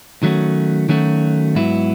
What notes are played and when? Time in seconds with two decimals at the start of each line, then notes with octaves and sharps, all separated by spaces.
0.23 D#3 F#3 A3 C#4 F#4
0.89 D#3 F#3 A3 C#4 F#4
1.55 G#2 F#3 B3 E4